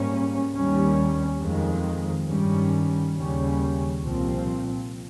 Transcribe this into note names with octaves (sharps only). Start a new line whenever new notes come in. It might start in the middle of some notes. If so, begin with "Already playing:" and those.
Already playing: G#2 G3 A#3 C#4
D#2 D#3 G3 C#4
F2 D#3 G#3
G2 D#3 G3 C#4
D#2 C#3 G3 C#4
C2 A#2 F3 C4